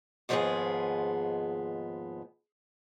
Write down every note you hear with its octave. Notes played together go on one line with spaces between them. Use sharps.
D#2 G#2 F3 G#3 B3 G#4